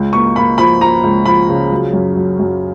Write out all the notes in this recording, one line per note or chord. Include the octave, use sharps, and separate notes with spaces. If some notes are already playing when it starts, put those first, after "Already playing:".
Already playing: C#2
A#3 C#6
A#3 B5
F3 B5
F3 A#5
C#2
F3 B5
C#3
F#3
F#2
F#3
F#2